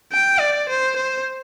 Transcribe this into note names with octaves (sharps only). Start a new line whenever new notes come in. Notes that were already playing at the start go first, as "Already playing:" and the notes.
G5
D5
C5
C5